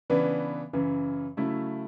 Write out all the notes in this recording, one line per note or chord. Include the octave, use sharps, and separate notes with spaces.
C#3 E3 B3 D4
F#2 C#3 E3
C#3 F#3 A3 E4